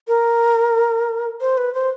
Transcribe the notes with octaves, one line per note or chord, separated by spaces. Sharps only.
A#4
C5
B4
C5